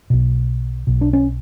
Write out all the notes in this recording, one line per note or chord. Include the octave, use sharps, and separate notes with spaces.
B1 B2
B1 B2
D4
C#4